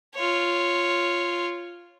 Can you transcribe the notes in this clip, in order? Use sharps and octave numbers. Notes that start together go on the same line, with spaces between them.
F4 C#5